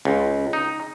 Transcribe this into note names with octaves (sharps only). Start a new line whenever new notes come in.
C#2
D#4